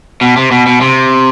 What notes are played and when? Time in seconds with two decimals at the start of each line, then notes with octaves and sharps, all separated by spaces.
0.21 B2
0.36 C3
0.51 B2
0.66 B2
0.81 C3